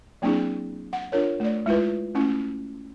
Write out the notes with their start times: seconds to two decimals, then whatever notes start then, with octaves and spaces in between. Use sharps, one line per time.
0.22 F#3 A#3 C4 D4 E4 G#4
0.93 F#5
1.12 D4 F4 A#4 C#5
1.40 A3 D5
1.66 G#3 E4 F4 B4
2.15 A3 C#4 E4